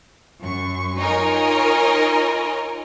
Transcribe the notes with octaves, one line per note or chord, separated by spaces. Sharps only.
F#2 C#6
D#4 F4 A#4 C#5 D#5 G#5